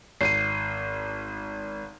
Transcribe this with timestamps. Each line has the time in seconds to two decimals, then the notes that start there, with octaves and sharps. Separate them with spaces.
0.21 G#1 C7 D#7